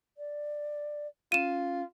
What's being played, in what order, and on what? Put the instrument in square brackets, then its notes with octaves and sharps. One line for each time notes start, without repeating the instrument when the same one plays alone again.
[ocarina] D5
[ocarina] C#4 [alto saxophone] F4 [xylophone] D#7 E7